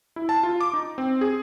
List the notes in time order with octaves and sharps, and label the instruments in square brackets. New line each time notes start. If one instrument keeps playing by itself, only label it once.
[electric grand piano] E4
A5
F4
D6
D#4
C4
G#4